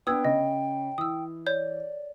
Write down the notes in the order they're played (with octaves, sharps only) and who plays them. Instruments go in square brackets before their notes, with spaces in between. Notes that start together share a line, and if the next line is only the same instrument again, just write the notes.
[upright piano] B3 D4 [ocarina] G5 [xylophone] D#6 E6 G#6
[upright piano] C#3 [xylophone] D#5
[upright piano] E3 [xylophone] D#6 E6
[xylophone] C#5 G6 [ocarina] D5